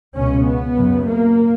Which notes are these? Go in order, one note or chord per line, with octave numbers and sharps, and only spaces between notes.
C#2 B2 C#4
B3
F#2 C#3
A#3